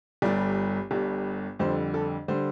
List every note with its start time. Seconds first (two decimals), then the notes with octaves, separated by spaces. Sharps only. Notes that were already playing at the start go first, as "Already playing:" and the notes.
0.22 G1 G2 G3 D5
0.91 G1 G2 G3
1.59 F2 D3 G3 C5
1.94 A4
2.28 D3 G3 C5